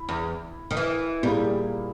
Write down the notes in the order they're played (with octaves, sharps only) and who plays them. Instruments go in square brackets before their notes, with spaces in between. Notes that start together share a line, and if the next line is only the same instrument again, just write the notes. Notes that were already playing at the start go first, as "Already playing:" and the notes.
Already playing: [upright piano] E4
[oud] E2
D#3
E3
[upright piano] A#2 A#3 E4 G#4 [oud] G3